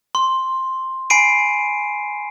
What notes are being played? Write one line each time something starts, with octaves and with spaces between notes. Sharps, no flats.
C6
G#5 B5 C7 D7 D#7